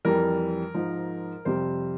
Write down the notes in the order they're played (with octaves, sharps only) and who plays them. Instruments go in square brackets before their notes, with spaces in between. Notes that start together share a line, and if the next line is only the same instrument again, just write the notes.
[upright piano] F2 E3 G3 A#4
G#2 F3
F2 C3 G3 C5